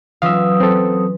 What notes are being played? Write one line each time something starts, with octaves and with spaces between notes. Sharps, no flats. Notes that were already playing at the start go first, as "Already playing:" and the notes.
E3 F#3 C#4 F4 F5 D#6 E6
C4 A4